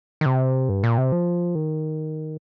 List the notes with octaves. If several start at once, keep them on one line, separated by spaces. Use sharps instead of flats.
D#3
C3
G2
A#2
C3
F3
D#3